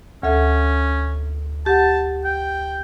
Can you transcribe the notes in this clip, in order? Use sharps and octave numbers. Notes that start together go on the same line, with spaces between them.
D2 C#4 A4 E5
G4 F#5 A5
G5